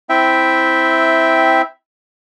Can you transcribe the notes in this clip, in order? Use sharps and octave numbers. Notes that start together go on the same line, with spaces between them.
C4 E4 E5 G5